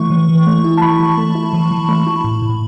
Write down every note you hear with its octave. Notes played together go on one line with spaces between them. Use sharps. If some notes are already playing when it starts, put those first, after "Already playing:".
Already playing: E3 A3 E4 C#6
E3
E3
A3
E4
A5
E3 B5
E3
A3
E4
E3
E3
A3
E4
A2
A2